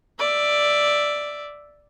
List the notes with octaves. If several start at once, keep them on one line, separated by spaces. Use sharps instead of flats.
D5 E5